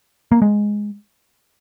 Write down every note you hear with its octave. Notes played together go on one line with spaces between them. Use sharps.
A#3
G#3